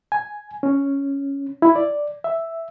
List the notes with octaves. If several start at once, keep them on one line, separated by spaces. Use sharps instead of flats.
G#5
C#4
E4
D5
E5